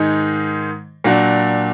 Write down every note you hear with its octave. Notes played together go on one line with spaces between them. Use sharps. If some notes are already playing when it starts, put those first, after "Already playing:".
Already playing: G#2 D#3 G#3 D#4
A#2 F#3 D4 F#4